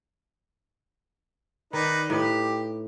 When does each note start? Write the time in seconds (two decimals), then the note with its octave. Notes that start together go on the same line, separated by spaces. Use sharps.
1.73 D#3 D#4 B4 D5
2.10 A2 D#4 G4 B4